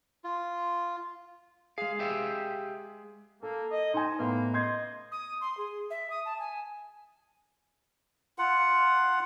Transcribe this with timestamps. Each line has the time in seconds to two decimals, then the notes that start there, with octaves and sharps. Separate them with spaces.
0.24 F4
1.78 G#3 G#4 F5
1.99 G4 E5 F5
3.43 A#3 A4
3.72 D#5
3.94 D#4 C5 G5 G#5
4.19 A2 A#3 B3
4.54 D#5 C6 G6 G#6
5.12 D#6
5.41 C6
5.57 G#4
5.90 E5
6.10 D#6
6.25 A5
6.39 G#5
8.38 F4 F#5